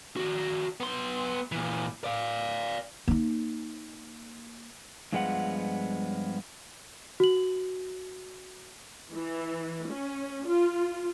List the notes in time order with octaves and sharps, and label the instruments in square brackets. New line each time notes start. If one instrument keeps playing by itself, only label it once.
[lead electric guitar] D#3 F#4
B3 C6
A#2 E3
D5 F5
[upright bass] A#3 D#4
[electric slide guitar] G2 F3 G#3 B3 F4 F#5
[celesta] F#4 F#7
[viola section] E3
C#4
F4